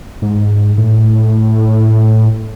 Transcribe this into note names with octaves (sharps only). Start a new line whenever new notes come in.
G#2
A2